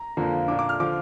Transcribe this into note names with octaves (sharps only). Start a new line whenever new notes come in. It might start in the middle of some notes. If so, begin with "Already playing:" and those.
Already playing: A#5
F2 D3 F3 A#3
A#2 A#3 D4 D6
D6
F6
D3 F3 D6